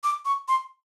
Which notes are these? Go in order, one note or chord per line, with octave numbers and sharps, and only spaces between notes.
D6
C#6
C6